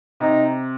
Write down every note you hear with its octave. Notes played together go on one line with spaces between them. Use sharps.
C3 D#4